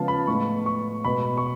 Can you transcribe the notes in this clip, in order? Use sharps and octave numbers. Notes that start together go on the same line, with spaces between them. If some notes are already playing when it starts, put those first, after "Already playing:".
Already playing: C#3 F3 G#3 B3 F5 A5
B5
A2 G#3 B3 C#6
C#6
B2 G#3 B3 B5
C#6